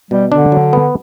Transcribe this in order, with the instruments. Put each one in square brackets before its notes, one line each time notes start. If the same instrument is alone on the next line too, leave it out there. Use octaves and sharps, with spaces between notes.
[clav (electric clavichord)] B2 [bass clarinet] G3
[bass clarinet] D3 [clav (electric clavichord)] D4
[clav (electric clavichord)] F#3
B3